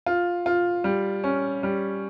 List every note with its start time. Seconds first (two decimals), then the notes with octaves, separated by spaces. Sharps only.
0.06 F4
0.46 F4
0.84 G3
1.24 C#4
1.63 G3